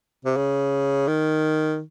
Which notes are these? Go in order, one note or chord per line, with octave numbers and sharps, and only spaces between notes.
C3
C#3
D#3